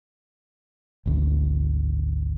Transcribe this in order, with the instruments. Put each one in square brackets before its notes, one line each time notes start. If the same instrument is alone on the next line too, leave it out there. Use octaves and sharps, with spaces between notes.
[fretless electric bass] G#1 D2